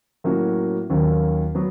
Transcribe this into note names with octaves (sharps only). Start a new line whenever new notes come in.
A2 F#3 A#3 C#4 F#4
D#2 D#3 F#3 A#3 C#4
F#3 B3